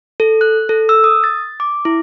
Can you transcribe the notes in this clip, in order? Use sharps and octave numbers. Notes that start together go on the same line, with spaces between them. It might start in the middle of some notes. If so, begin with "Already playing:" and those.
A4
F#6
A4
E6
D#6
A6
D6
E4